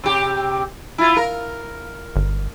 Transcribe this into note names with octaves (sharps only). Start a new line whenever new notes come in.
C3 G4
E4 F4
A#4
G1